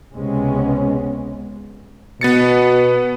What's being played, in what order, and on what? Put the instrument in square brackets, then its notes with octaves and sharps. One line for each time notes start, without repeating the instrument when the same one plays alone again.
[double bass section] C#2 C3 G#3 B3 C#4
[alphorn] B2 [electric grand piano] B3 A6 C#7